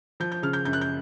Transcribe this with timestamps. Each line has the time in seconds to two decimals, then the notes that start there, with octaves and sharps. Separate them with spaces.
0.20 F3 G6
0.32 G6
0.43 C#3 F6
0.53 G6
0.65 F#2 G6
0.73 F#6
0.81 G6